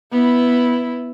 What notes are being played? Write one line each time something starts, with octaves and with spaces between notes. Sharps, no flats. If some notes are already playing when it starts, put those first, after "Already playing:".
B3 E4